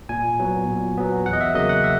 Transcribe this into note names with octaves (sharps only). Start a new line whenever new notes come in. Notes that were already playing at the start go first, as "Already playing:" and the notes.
A#2 G#5
F#3 B3
A#2
F#3 B3
E2 F#5
D#5
E5
C#3 F#3 A#3 D#5
F#5
E5